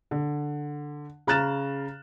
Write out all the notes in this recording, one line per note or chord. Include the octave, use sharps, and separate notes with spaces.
D3
C#3 A#5 F6 F#6 A6 E7